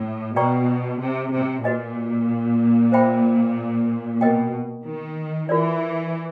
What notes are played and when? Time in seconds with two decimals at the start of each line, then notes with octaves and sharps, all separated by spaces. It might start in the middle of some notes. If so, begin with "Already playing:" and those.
Already playing: A2
0.35 B2 B4 D5 G5 A#5 C#6
1.00 C3
1.32 C3
1.64 A#2 F#4 B4 D#5 G#5
2.92 C5 E5 G5 B5
4.21 B2 A#4 D#5 G5
4.85 D#3
5.49 E3 F4 A#4 D5